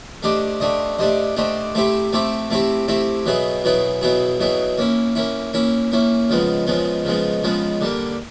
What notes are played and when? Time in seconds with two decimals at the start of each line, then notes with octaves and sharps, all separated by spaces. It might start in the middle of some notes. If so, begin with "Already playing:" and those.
0.23 A3 D4 G4 C5 D#5
0.60 A3 D4 G4 C5 D#5
0.98 A3 D4 G4 C5 D#5
1.36 A3 D4 G4 C5 D#5
1.75 A3 C4 E4 G4 C5
2.13 A3 C4 E4 G4 C5
2.50 A3 C4 E4 G4 C5
2.88 A3 C4 E4 G4 C5
3.26 B2 F#3 B3 E4 G#4
3.64 B2 F#3 B3 E4 G#4
4.01 B2 F#3 B3 E4 G#4
4.40 B2 F#3 B3 E4 G#4
4.78 A#3 C#4 E4
5.15 A#3 C#4 E4
5.53 A#3 C#4 E4
5.92 A#3 C#4 E4
6.30 C#3 F3 G#3 B3
6.67 C#3 F3 G#3 B3
7.05 C#3 F3 G#3 B3
7.43 C#3 F3 G#3 B3
7.81 D3 G3 A#3